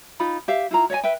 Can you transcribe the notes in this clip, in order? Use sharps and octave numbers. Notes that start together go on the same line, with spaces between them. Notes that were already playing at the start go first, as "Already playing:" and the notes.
D#4 F4 B5
G4 E5 F5
E4 F4 A#5
C#5 D#5 E5 G#5
B4 E5 G5